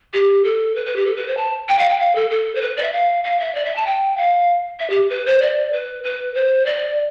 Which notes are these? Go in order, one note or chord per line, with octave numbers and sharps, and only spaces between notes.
G4
A4
B4
B4
G4
A4
B4
C5
A5
G5
F5
G5
F5
A4
A4
C5
B4
D5
E5
F5
F5
E5
D5
E5
A5
G5
F5
E5
G4
B4
C5
D5
B4
B4
C5
D5